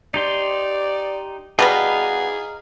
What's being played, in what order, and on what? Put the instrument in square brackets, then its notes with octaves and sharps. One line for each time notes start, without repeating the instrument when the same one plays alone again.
[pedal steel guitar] D#4 G4 C6 [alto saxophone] D5
[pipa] B2 G3 B3 [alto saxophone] G#4 [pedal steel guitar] D#5 F5 A#5